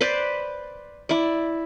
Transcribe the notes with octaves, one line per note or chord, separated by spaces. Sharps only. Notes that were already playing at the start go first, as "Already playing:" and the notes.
B4 C5 D5
E4 D5